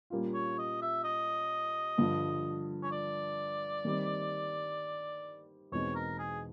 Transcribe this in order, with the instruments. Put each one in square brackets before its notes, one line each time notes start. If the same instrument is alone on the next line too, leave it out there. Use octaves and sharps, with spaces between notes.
[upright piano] A#2 G3 A#3 C#4 F4
[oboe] C#5
D#5
E5
D#5
[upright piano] G2 D3 F3
[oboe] C#5
D5
[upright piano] D#3 G3 C4
[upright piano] E2 B2 G#3 C4 D#4 [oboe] C#5
[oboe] A#4
G#4